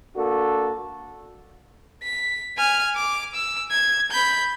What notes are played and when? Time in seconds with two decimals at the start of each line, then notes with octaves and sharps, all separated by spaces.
0.14 A#3 D4 F#4 A4
2.03 B6
2.57 G#5 F6
2.96 D6
3.35 E6
3.71 G#6
4.11 B5 G6